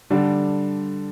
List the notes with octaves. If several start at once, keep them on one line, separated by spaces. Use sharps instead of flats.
D3 G3 D4